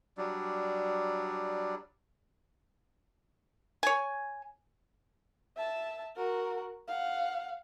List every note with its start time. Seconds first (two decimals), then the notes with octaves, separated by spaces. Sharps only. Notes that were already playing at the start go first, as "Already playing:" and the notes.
0.18 F#3 G3 D4
3.83 C#5 G#5
5.57 E5 A5
6.16 F#4 A#4
6.88 F5 F#5